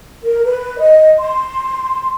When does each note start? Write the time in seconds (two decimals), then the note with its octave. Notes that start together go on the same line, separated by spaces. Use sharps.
0.24 A#4
0.45 B4
0.79 D#5
1.19 C6